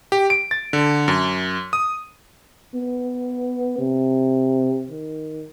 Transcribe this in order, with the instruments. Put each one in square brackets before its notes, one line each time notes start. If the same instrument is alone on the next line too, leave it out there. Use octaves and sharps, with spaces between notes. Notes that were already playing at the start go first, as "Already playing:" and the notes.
[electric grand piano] G4
D7
A6
D3
F#2
D#6
[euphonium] B3
C3
D#3